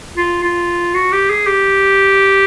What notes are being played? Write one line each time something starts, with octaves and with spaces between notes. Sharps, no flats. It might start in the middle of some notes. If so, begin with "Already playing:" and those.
F4
F4
F#4
G4
G#4
G4